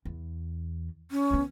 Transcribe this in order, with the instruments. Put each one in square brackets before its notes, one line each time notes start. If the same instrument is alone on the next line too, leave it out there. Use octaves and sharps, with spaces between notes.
[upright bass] E2
[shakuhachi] C#4
[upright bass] D#3 B3